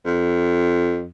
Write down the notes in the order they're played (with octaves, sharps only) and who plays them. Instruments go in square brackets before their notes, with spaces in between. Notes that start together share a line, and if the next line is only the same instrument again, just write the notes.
[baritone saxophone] F2